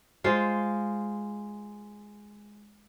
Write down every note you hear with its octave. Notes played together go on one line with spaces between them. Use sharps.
G#3 F4 C5